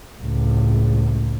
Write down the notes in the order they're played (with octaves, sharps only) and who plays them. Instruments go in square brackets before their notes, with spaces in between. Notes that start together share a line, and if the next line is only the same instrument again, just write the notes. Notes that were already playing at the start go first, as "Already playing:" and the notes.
[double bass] C#2 A2